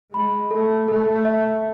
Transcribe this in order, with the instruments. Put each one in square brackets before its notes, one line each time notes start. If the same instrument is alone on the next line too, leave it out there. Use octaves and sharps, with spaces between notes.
[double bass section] G#3 [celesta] B5
[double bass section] A3 [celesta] A4
[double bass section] A3 [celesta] A4
[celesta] E5